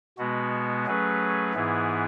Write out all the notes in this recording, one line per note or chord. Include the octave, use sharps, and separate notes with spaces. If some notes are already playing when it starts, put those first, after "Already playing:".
B2 G#3 B3 F#4
F#3 A3 C#4 G#4 B4
G#2 E3 B3 E4 G#4